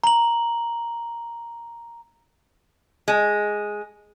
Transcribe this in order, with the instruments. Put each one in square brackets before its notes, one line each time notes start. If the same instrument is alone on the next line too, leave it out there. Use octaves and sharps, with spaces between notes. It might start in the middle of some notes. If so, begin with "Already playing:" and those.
[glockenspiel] A#5 F#7
[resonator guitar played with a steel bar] G#3